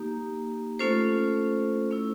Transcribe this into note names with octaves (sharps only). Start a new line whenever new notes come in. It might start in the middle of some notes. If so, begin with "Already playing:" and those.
Already playing: A#3 D#4 G4
A3 C#4 F4 A4 C5
A3 C#4 E4